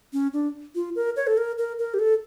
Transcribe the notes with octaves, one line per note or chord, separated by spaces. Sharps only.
C#4
D4
F4
A#4
C#5
A4
A#4
A#4
A#4
G4
A4